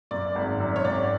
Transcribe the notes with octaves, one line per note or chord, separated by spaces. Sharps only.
F#2 D5
G#1
F#2
C#5
G#1 D5